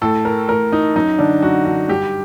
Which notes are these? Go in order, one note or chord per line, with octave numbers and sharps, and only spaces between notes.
A2 A4
A#4
A2 A#4
D#4
F#2 D#4
D3 D4
F#2 F#4
D3 F#4
G2 G4